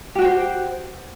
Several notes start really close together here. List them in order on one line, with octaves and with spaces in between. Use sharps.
G4 F#4 G5 C5